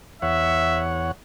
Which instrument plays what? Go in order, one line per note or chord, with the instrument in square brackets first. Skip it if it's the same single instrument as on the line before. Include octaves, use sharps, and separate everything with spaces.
[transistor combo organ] E2 C#5 F#5 [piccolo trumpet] E5